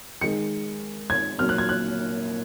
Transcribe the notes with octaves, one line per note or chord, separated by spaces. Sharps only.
D#3 G#3 C#7
G#6
A#2 F#3 A#3 F6
F#6
G#6
F#6